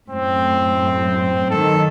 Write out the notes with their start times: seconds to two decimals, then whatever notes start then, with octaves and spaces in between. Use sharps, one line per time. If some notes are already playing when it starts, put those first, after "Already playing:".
0.10 F#2 A2 C4
1.50 D#3 F#3 A4